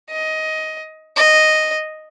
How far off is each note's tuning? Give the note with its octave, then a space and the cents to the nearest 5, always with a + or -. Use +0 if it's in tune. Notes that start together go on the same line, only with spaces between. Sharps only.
D#5 +15
D#5 -5